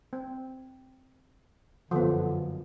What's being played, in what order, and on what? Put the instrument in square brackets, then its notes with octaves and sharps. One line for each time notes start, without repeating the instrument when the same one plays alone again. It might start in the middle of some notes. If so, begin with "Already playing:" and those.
[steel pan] C4
[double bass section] G1 F#2 D#3 [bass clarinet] D3 [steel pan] F3 B3